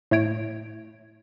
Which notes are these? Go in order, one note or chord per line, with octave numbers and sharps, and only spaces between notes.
A2 A3 C#5 D7